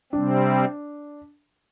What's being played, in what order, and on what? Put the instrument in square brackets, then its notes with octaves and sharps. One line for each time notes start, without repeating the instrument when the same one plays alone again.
[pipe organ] C3 G3 C4 [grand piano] D4